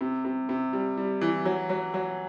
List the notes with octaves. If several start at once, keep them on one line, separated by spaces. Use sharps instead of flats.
C3
C3
C3
G3
G3
E3
F#3
F#3
F#3